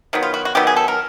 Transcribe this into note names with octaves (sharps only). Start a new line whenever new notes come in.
D#3 F#3 B3
F4
F#4
F#4
D#3 F#3 B3 G4
G#4
A4
A#4